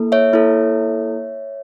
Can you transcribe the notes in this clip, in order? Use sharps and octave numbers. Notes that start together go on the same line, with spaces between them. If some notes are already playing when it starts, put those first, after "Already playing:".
Already playing: A#3 E4 A4
C#5 E5
A#3 E4 A4